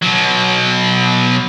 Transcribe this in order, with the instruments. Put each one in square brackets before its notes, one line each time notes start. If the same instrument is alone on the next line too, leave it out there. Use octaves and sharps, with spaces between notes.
[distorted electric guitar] B2 F#3